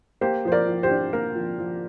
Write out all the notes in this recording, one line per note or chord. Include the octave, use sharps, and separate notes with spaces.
A#3 G4 C5
F3 C5
A#4 D5
F3
G4 C5
D4
A#3 A#4
F3
F3